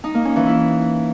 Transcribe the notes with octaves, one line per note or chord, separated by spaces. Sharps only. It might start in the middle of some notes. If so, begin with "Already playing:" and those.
D#4
A#3
C#4
E3
E4